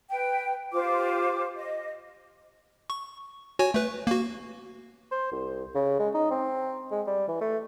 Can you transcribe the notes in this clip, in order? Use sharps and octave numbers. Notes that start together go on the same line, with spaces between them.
B4 G5
F4 G4 C5 D6
D#5
C#6
F#4 C#5 G#5
A3 B4
A#3 F#4
C5
C2
C#3
G#3
D#4
C4
G#3
G3
E3
A3